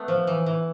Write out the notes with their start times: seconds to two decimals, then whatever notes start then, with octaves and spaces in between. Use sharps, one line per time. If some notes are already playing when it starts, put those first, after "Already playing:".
Already playing: A3 B3 D4
0.08 F3
0.27 E3
0.46 E3